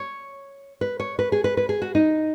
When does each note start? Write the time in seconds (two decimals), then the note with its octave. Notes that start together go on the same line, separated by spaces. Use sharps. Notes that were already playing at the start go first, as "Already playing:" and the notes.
Already playing: C#5
0.81 B4
1.00 C#5
1.19 B4
1.32 G#4
1.44 B4
1.57 B4
1.69 G#4
1.82 F#4
1.95 D#4